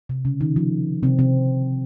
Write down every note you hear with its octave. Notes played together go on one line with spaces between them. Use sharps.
C3
C#3
D#3
F3
C3 C4
C3 C4